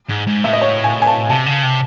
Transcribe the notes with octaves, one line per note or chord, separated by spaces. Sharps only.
G#2
G#2
A2 E5
D#5
C#5
G#5
G#5
A5
C3 A5
C#3
C3